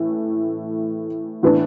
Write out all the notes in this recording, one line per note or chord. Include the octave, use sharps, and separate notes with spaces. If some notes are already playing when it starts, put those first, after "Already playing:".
Already playing: A2 E3 A3
A2 E3 B3 D4